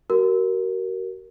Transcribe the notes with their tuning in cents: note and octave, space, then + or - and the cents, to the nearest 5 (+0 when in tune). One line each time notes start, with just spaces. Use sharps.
F#4 +40 A#4 +0